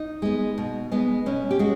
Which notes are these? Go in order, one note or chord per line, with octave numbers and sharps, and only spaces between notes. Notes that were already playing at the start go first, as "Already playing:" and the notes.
Already playing: D#4
G#3 B3
B2
G#3 B3
B2 C#4
G4
G#3 F#4